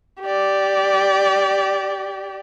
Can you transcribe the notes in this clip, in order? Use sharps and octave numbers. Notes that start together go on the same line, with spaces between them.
G4 D5